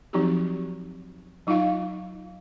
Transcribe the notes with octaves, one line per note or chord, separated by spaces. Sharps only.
F3 F#3 C4 D#4 F#4 G4
F#3 D#4 F4 D#5 F5 C#6